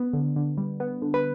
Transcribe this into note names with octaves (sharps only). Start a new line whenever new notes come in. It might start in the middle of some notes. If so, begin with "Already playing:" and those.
Already playing: B3
D3
D3
G3
B3
D3
B4